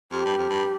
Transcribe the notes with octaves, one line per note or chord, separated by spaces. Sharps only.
F2 G4
G2
F2
G2